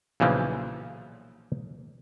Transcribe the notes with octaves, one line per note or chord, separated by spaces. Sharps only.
B1 A#2 C#3 E3 F3 A#3